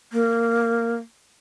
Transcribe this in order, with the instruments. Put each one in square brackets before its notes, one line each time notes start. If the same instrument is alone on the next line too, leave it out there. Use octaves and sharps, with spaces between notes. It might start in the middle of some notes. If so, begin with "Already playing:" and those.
[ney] A#3